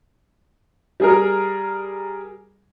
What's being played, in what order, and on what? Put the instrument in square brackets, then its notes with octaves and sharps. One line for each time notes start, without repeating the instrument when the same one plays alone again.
[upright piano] G3 G#4 A#4